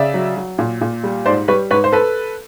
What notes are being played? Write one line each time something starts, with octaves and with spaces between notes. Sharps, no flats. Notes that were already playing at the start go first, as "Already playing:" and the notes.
Already playing: C#3 D5 E5
F#3
F#3
A#2
A#2
G3
G#2 C5 D5
G3 B4 C#5
G#2 B4 C#5
C5
A4 B4